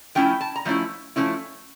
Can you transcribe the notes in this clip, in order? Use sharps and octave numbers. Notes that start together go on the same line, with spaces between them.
F3 A3 C#4 E4 G5
A5
A#5
F3 A3 C#4 E4
F3 A3 C#4 E4